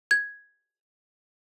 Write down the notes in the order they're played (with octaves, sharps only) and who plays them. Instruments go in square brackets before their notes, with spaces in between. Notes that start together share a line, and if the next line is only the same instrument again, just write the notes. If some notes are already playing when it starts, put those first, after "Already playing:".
[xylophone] G#6